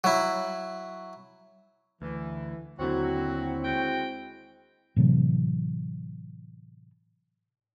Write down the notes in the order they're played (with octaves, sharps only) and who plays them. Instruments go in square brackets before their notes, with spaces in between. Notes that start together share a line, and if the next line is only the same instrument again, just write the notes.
[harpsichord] F#3 E4
[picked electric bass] D2 [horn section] E3
[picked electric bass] D#2 D3 [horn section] F#3 F#4 [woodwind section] C4 E4
[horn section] G#3 F#4 G5
[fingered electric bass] A2 C3 E3 F#3